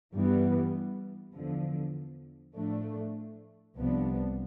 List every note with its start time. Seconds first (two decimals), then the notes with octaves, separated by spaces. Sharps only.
0.13 G2 E3 G3 B3
1.34 E2 D3 F3
2.55 A2 F3 A3 D4
3.75 C2 C3 F3 B3 D4